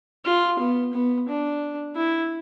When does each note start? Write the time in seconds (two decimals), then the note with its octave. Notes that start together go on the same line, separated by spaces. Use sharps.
0.25 F4
0.59 B3
0.94 B3
1.28 D4
1.95 E4